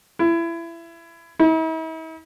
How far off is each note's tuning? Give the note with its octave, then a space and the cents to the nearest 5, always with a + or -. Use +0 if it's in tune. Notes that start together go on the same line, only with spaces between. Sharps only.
E4 +25
E4 -45